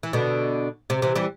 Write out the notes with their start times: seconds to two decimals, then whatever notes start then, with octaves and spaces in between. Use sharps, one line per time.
0.03 E3
0.13 B2 D3
0.90 C3
1.02 C3 E3
1.16 E3 G3